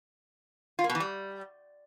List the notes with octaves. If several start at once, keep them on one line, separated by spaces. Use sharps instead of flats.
F4
A#3
B2
E3
G3